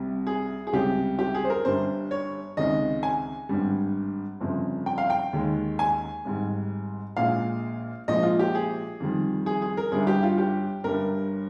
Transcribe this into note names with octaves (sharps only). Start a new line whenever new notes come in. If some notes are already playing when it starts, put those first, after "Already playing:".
Already playing: C2 C3 G3
G#4
G#4
C#2 C3 G3 G4
G4
G#4
C5
A#4
G1 G2 G3 C5
C#5
C#2 C3 D#3 G#3 D#5
G#5
G#1 G2 G3
G1 F2 C#3
G5
F5
G5
D#2 D#3 G#3
G#5
G#1 G#2 G3
A#1 A#2 G#3 F5
A#1 A#2 F3 G#3 D#5
F4
G4
G#4
F2 D#3 G3
G#4
G#4
A#4
G1 G2 G3 G#4
G4
F4
G4
G1 G2 G3 A#4